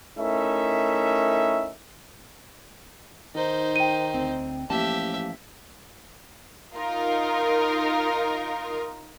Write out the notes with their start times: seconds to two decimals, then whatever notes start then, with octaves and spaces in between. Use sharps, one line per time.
0.18 A3 C#4 D#4 E4 A#4 E5
3.35 D#3 D#4 C5
3.76 G5 D#7
4.14 D2 C4
4.70 A1 F3 A#3 G4 E5 A5
6.74 D#4 F4 A#4